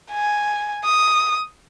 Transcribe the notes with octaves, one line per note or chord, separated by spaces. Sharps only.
G#5
D#6